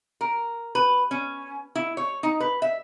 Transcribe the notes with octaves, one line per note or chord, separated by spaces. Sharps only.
A#4
B4
C#4
E4
C#5
D#4
B4
E5